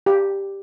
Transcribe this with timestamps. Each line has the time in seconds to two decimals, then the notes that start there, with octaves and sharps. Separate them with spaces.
0.06 G4